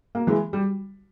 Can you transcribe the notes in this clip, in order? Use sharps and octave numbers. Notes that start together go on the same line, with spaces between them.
A#3
E3 G#3
G3